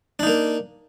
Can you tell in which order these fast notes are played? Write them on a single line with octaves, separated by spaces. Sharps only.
D4 D#4 A#3